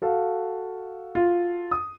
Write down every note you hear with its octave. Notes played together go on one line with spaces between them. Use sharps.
F#4 A4 F5
F4
D#6